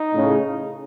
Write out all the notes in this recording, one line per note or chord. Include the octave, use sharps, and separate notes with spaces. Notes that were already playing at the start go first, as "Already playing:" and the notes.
Already playing: D#4
A2 C#3